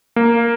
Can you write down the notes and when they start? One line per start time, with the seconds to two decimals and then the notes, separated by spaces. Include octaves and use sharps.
0.16 A#3